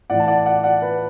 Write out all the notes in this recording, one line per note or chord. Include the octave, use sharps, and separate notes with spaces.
A2 E3 D5 F#5
A5
D5 F#5
D5 F#5
D5 F#5
B4